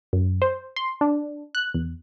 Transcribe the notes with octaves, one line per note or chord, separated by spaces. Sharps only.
F#2
C5
C6
D4
F#6
E2